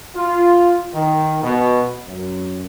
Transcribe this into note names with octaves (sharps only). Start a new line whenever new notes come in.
F4
D#3
B2
F#2